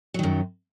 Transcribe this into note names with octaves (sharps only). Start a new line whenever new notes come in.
F#2 D#3 F#3